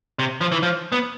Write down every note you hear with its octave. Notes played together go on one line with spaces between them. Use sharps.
C3
F3
E3
F3
B3